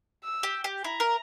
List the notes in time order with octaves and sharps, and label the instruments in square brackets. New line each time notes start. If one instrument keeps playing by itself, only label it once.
[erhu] E6
[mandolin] G4
G4
[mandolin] E4 [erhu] A#5
[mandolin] A#4